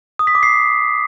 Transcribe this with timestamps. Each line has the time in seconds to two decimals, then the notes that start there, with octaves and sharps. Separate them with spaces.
0.19 D#6
0.27 B6
0.35 D6
0.43 C7